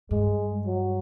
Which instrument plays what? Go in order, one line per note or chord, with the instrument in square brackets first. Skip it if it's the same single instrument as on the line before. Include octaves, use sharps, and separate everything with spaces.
[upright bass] G2 [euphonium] G#3
[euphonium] F#3